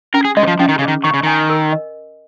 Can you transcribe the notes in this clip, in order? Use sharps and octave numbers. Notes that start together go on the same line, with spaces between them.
C#4 A#4
G#4
G#3 D#5
D#3
F3
F3 C#4
D#3
C#3 G#4
D#3
D#3 C#6
C#3
D#3 G#5
A#4
D#5